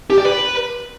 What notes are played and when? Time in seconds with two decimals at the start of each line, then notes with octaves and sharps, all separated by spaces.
0.10 G4
0.18 D5
0.25 B4